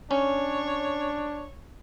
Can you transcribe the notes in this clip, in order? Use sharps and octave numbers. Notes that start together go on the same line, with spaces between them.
C#4 D4 C#5